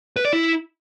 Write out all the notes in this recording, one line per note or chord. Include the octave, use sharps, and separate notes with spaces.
B4
D5
E4